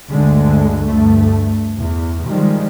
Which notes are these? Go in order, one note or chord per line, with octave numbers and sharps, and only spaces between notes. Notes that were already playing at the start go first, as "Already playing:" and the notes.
D2 G2 D3 G#3
D2 G2 A3
E2
D#3 F3 G3 G#3